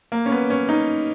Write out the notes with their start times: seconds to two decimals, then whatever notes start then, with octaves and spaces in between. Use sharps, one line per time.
0.12 A#3
0.26 C#4
0.31 B3
0.50 C#4
0.69 D#4